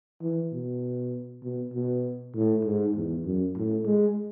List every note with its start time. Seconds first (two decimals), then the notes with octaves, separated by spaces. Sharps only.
0.21 E3
0.52 B2
1.43 B2
1.73 B2
2.35 A2
2.64 G#2
2.95 E2
3.25 F#2
3.56 A2
3.86 G#3